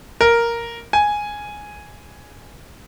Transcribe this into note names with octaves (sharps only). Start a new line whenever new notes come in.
A#4
G#5